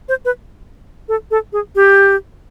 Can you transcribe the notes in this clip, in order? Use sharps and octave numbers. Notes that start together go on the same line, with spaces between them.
C5
B4
A4
A4
G#4
G4